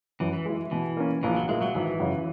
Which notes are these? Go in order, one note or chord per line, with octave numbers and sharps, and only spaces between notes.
F#2 E3
E3
E3 G#3
B2 E3
A#3 C#4
A#1 E3
F#3
A#2 G#3 A#3 E4
F#3
G#1 E3
F#2 C#3